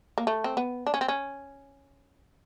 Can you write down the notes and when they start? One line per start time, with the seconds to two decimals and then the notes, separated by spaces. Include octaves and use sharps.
0.18 A#3
0.27 A3
0.44 C4
0.57 B3
0.87 D4
0.94 C#4
1.01 C4
1.08 C#4